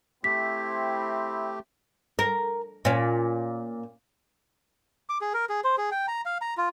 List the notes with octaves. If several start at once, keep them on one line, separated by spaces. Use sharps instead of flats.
A3 C4 E4 G4 B6
A#4
A#2 C#4
D6
G#4
A#4
G#4
C5
G#4
G5
A#5
F5
A#5
F4